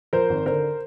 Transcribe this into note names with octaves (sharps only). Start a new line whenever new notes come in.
F3 A#4 C5
G#1
D3 A#4 C5